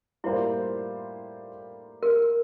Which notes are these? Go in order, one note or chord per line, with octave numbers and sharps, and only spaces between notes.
A2 G3 A#3 E4 F4 C5
A#4